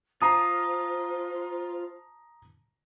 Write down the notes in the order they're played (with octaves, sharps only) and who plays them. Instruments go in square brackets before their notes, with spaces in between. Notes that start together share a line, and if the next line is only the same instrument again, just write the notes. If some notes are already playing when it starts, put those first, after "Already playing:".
[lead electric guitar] F4 [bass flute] C5 [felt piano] A5 A#5 C7 [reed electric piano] D#6